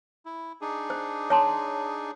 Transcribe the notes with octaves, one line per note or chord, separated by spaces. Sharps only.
E4
D4 D#4 G#4
C5
C#5 A5 C6